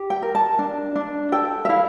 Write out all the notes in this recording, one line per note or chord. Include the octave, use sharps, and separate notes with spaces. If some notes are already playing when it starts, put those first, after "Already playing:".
Already playing: G4
G5
A#4
A5
D4
D4
A4 G5
E5
E4 F5